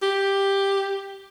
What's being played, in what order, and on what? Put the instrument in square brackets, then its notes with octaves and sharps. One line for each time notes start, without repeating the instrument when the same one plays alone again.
[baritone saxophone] G4